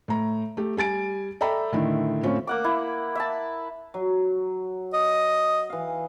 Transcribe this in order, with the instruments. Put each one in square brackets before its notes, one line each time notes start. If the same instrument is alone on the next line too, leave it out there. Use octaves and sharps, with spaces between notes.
[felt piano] A2 A#5
A3 G4
G3 G#5 A6 D7
A4 D5 E5 G5 A#5 B5
A2 D3 D#3 E4
A2 C4 C#4 F4
[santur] A#3 F#5 D6
E4
E5 A5
[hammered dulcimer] F#3
[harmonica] D#5
[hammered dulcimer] E3 F5